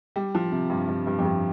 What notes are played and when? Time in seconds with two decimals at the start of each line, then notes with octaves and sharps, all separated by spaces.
0.16 G3
0.35 F3
0.52 C3
0.70 G2
0.88 G2
1.07 G2
1.19 F2
1.25 G2